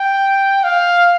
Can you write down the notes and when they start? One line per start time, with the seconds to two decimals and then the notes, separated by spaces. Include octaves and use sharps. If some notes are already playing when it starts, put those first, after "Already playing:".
Already playing: G5
0.64 F5